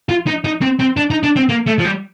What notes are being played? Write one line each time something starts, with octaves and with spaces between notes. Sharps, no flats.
F4
D#4
D#4
C4
C4
D4
D#4
D4
C4
A#3
A3
F3
G3